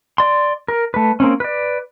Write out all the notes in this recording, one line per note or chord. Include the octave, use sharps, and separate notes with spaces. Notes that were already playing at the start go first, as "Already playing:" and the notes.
D5 C6
A#4
A3 B4
A#3 C4 C#4
B4 D5